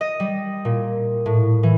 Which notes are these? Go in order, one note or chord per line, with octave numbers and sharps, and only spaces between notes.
D#5
G3
A#2
A2
E3